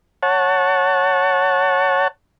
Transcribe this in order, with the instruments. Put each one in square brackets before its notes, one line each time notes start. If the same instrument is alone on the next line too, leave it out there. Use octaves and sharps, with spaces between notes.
[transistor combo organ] C#5 F#5 A5